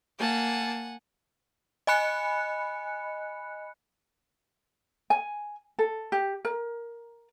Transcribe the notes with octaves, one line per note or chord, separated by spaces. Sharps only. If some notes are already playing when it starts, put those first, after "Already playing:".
A#3 F#5 G#5 A5
D#5 G#5 B5 F#6 C#7
G#5
A4
G4
A#4